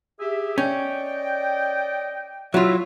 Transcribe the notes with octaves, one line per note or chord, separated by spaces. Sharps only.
G4 G#4 E5
C#4 D5 D#5 G5
F#3 E4 F4 E5